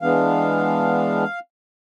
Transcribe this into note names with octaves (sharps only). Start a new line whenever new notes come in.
E3 G#3 B3 D4 F5